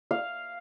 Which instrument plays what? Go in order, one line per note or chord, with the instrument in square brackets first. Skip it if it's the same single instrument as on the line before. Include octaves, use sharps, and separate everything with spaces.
[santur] F5